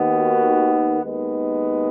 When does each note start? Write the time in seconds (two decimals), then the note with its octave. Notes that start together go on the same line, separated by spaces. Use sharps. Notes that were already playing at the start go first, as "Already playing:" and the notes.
Already playing: D#2 D#3 B3
0.14 F#4
1.03 D#2 D#3 G#3 B3